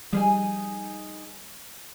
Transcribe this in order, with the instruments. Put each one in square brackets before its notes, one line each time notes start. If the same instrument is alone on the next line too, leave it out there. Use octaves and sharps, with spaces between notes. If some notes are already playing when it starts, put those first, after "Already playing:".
[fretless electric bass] F3 G3 [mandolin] D#4 G#4 G#5